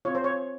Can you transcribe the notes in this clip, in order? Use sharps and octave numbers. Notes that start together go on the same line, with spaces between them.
C4 F4 C#5
C5
C#5